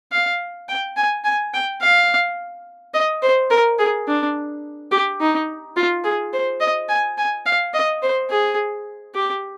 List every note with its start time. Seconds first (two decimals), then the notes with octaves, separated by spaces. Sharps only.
0.12 F5
0.69 G5
0.97 G#5
1.24 G#5
1.54 G5
1.82 F5
2.94 D#5
3.22 C5
3.51 A#4
3.78 G#4
4.08 D4
4.91 G4
5.20 D#4
5.76 F4
6.04 G#4
6.33 C5
6.61 D#5
6.89 G#5
7.18 G#5
7.46 F5
7.74 D#5
8.03 C5
8.30 G#4
9.15 G4